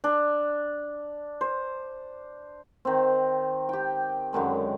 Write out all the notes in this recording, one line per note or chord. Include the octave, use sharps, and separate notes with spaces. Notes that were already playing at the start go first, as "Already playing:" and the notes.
D4
C5
D#3 C4
G4 G5
F#2 D3 D#3 G#3